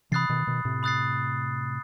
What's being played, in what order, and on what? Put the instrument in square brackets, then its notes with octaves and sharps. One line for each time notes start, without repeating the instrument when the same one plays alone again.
[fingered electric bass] C3 E3 [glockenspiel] B5 D#6 F#6 A6 C7
[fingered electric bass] B2 D#3
B2 D#3
A2 C3
[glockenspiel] B5 D#6 F#6 A6 C7